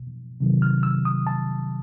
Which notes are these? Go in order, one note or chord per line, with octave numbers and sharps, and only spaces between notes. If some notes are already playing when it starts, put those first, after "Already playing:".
Already playing: B2
C3 D#3 F#3
F6
E6
D#6
A5